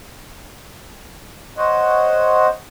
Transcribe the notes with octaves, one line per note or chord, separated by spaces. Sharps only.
C5 C#5 D#5 F#5